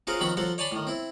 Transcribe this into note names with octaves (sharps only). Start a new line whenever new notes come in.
C#4 F4 F#4 G#4 A#4 C5
D#3 F3 F#3 C4 B5 C#6
F3 F#3 F#4 A4 C5
C#5 D5 G#5 A5 B5 C6
A2 D#3
C4 E4